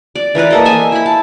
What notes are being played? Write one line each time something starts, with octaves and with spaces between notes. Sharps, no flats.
D5
E3 A#4 B4 D5
A#3 A4 D#5
C5 E5 G#5
E4 B5
A5